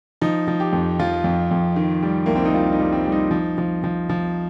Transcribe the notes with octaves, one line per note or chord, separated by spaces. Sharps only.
F3 D#4
F3
G4
F2
F3 F4
F2
F2
D#3
G3
C2 A#3
C4
D#4
C2 F4
D#4
G3
C4
G3
D#4
F3
F3
F3
F3